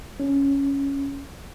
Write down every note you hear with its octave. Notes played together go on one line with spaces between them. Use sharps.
C#4